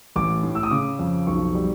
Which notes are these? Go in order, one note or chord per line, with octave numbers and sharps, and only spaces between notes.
A1 D6
A2
E6
D#6
C#3 D6
F2
B1 C#6
G3